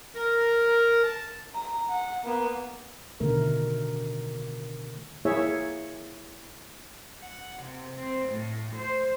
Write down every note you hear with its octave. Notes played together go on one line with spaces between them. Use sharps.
A#4
A5
A#5
F#5
A#3 B3
B2 D3 D#3 A3 A#4
A#3 E4 G#4 C#5 E5
F#5
C3
C4
A2
C5